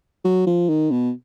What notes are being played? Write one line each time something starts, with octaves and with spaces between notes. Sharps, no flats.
F#3
F3
D#3
B2